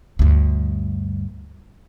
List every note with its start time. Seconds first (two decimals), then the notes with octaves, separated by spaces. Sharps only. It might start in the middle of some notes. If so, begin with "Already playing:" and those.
0.19 D2 G2